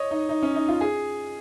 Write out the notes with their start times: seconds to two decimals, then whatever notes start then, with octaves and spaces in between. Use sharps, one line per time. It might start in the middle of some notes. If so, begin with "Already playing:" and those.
Already playing: C#5 D#5
0.11 D#4
0.29 D#4
0.42 C#4
0.55 D#4
0.68 F4
0.81 G#4